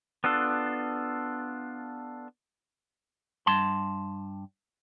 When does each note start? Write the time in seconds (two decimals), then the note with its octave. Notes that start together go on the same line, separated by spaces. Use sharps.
0.24 B3 D4 F4 A4
3.46 G2 A5 C6